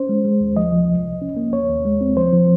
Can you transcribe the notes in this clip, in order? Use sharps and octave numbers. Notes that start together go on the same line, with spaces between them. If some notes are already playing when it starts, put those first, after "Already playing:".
Already playing: C#4 C5
G#3
G#3
D#2
F3 D#5
F3
C2
C2
C#4
A#3
D#2 C#5
D#2
G#3
C4
F3 C5
F3